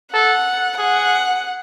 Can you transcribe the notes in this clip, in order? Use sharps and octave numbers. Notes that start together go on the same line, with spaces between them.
A4 F#5
G#4 F#5